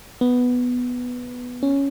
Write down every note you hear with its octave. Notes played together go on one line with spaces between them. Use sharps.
B3
C#4